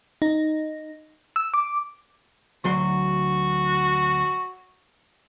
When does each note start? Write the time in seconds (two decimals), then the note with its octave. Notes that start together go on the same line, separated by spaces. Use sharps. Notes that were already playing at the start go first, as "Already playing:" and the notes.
0.22 D#4
1.36 E6
1.54 D6
2.64 D2 F#3 F#4 C6